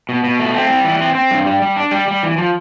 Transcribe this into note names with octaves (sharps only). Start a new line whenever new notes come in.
B2
B2
A3
C4
G3
E3
C4
C4
G2
G3
G3
D4
G3
G3
E3
F3